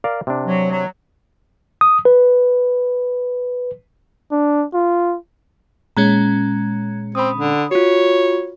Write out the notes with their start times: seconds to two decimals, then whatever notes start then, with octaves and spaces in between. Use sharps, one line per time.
0.04 A#4 D5 F5
0.27 C3 D4
0.46 F#3
0.71 F#3
1.81 D#6
2.05 B4
4.31 D4
4.74 F4
5.97 A#2 G#3 C#4 A#5 F#6 G#6
7.15 C4 B5 D#6
7.35 D3
7.71 F4 F#4 C#5